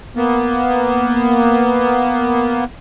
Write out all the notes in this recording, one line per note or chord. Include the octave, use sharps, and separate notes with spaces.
A#3 B3